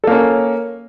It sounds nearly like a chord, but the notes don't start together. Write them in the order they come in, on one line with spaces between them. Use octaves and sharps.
A4 A#3 C#4